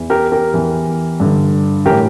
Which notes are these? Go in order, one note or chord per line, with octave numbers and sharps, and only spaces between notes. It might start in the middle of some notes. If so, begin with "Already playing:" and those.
Already playing: E2 E3
G4 A#4
G4 A#4
E2 E3
G2 D3
A2 E3 G4 A#4